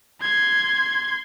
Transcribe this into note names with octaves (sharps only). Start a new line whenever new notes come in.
C6 G#6